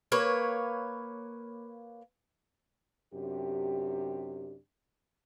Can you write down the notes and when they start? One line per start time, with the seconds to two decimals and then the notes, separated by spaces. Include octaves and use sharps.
0.12 A#3 B4 C#5
3.14 F#2 C3 D4 G4